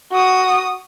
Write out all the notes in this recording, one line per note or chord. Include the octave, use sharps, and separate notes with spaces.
F#4 D#6